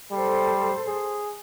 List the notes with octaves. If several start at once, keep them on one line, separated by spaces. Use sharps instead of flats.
G3 A4 C5
G#4